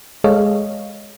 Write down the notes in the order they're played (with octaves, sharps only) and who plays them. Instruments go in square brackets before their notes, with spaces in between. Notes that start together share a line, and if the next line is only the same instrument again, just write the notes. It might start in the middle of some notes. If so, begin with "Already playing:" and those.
[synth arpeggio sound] G#3 G#4 A4 C#5 D#5 F5